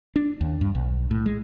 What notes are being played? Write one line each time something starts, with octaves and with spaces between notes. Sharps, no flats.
D4
D#2
G2
B1
A2
G#3